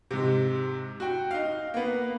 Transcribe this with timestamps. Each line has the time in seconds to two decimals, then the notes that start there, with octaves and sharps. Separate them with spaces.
0.11 G#2 C3
1.00 F#4 G5
1.31 D#4 F5
1.74 A#3 B3